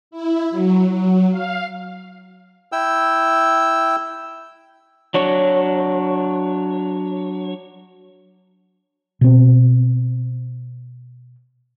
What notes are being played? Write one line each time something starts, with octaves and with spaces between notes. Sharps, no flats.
E4
F#3
F#3
F5
E4 G5 E6
F#3 D4 C#5
B2 C4